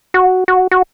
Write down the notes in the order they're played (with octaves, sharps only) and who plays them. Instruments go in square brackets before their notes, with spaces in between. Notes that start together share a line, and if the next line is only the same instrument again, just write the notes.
[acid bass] F#4
F#4
F#4